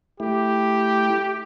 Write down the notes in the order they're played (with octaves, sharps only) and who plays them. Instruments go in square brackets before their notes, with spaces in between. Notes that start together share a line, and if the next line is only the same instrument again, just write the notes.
[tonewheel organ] A3 E4 [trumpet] G4